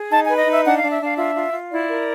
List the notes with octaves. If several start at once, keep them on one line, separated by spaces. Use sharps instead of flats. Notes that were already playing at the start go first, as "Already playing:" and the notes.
Already playing: G#4
D#4 A5
B4 G#5
D#5
D#4 E5
D4 F#5
D4 F5
E5
D4 F5
F4 E5
F4
F4
E4 D5
A#4